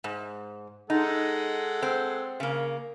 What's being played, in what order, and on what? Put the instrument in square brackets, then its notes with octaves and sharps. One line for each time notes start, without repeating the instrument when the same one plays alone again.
[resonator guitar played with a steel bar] G#2
[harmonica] G#3 A4 F#5 [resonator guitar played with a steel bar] D#4
[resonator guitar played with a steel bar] C4
C#3 A#3